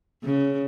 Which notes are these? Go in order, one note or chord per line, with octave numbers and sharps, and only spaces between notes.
C#3